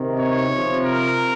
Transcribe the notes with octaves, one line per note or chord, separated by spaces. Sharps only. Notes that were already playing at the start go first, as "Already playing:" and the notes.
Already playing: C3 D#3
C#5
C3 F3
A#4